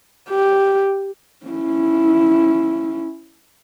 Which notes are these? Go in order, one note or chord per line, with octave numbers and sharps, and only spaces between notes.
G4
C#4 E4